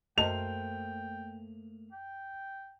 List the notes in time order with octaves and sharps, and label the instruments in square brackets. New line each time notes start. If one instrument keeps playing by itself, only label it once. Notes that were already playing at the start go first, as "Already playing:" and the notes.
[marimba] F#2 D#5 A5 [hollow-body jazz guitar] A3 A#3 C5 [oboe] G5 [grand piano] F7
[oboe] G5